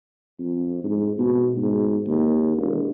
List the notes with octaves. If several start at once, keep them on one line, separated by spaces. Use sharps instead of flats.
F2
G#2
B2
G#2
D#2
E1